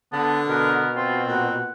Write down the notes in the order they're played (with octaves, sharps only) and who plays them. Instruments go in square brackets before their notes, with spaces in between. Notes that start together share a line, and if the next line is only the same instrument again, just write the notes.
[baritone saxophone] D3 [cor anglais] B3 [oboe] A5
[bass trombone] B2 [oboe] B3 [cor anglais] A#4
[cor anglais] C4 [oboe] F4
[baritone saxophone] A#2 [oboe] F#5